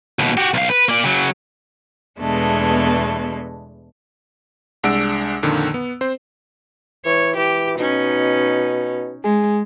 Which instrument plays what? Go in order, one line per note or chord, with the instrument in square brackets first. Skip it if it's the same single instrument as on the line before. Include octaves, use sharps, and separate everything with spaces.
[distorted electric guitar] D#2 B2
F#4 G4
B1 F5
B4
A#3 D5
C#3 F#3
[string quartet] E2 B2 G#3 A3 D4
[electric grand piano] C2 G#3 D4 F#5 E6 D7
F2 A#2 D3 D#3
B3
C4 C5
[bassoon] E3 [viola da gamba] C#5
[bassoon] E3 [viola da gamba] G4
[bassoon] B2 [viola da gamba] C#4 D#4
[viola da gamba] G#3 [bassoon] G#4